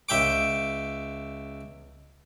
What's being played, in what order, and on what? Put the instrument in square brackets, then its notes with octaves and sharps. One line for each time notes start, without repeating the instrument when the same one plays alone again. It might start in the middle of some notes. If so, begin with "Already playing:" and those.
[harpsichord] C#2 E5 G5 D6